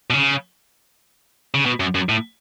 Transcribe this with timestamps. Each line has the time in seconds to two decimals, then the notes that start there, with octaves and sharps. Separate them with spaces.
0.10 B2
0.14 C#3
1.54 C#3
1.66 B2
1.80 F#2
1.95 F#2
2.09 A2